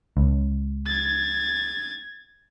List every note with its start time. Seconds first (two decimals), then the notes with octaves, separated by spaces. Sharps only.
0.17 C#2
0.86 G#6 A6